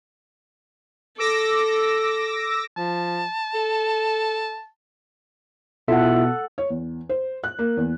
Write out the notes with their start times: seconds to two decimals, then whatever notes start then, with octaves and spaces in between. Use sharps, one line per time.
1.18 A4 D6 E6 A#6
2.77 F3 A5
3.55 A4
5.88 B2 E4 F4 A4 E5 F#5
6.58 C#5
6.70 E2
7.09 C5
7.44 F#6
7.59 A#3
7.77 E2